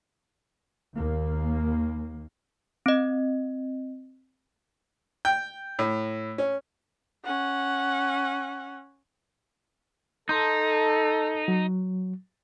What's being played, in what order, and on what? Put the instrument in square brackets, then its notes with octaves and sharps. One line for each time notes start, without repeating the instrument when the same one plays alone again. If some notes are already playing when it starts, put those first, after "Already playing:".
[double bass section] D#2 A#3
[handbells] C4 D#5
[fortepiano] G5
A2
C#4
[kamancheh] C#4 F#5
[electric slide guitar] D#4 [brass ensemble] A4 [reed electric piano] C6 G6
[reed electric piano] F#3